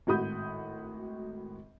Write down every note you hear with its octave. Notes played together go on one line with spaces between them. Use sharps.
G#1 A2 F#4 B5 D#6 G6